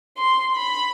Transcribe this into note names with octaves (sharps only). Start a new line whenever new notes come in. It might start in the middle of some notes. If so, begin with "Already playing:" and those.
C6
B5